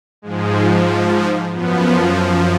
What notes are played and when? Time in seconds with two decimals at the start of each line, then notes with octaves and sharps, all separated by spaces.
0.22 G#2 F3 G#3
1.52 F#2 F3 B3